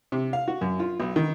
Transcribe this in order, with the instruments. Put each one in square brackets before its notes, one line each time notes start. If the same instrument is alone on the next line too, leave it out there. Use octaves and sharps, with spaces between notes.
[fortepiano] C3
F5
F#4
F#2
F4
B1
D#3